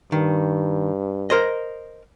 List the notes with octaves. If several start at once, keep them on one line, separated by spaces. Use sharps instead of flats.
G2 D#3
A#4 C5 D#5